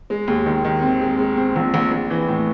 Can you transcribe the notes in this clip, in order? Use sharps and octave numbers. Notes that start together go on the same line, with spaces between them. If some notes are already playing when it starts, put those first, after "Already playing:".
G#3
D#2
D#3
D#3
C4
G#3
G#3
C4
A#1
A#1
A#1
E3
A2